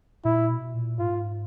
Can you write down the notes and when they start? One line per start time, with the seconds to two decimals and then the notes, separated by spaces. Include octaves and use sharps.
0.25 A#2 E4
0.50 B2
0.74 A#2
0.99 G#2 F4